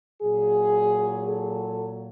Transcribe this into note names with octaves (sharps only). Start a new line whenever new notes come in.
A#2 F#3 G#4
A4